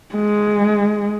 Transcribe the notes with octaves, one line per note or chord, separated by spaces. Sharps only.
G#3